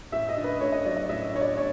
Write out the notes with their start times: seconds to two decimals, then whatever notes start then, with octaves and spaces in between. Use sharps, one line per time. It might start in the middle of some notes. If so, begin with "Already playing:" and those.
0.12 A2 E5
0.29 D#5
0.37 D4
0.44 B4
0.60 A3 C#5
0.72 D#5
0.85 F#3 D5
0.97 D#5
1.09 A2 E5
1.34 D4 C#5
1.41 D5
1.57 C#5